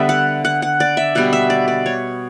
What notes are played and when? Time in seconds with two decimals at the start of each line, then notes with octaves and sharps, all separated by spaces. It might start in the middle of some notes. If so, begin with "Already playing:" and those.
Already playing: D3 G3 B3 E5
0.09 F#5
0.45 F#5
0.62 F#5
0.80 D5
0.97 E5
1.15 B2 G3 B3 F#5
1.33 E5
1.50 D5
1.68 D5
1.86 C#5